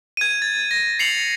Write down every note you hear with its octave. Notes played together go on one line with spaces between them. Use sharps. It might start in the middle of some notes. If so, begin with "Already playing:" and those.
G#6 D#7
A6
A#6
C7 C#7 F7 F#7